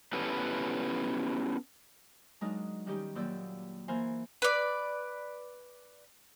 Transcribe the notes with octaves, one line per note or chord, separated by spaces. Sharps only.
B3 C#4 E4 G4 A4 B4
F#3 G#3 D4 D#4 A#4
D#3 G3 C#4 D#4 G4
D#2 A#2 F#3 D5 E6 G6
E3 A#3 A#4 C5 G#5
B4 D5